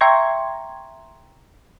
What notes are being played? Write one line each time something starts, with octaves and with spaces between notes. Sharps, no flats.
E5 G5 A#5 C6 C#6 G#6